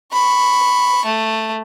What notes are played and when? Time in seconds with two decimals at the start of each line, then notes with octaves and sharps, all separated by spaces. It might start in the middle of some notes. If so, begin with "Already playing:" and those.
0.13 B5 C#6
1.05 A3